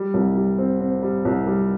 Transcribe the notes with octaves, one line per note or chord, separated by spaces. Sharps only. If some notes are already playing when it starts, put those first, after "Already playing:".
Already playing: G3
C2
G3
C4
C4
G3
C2
G3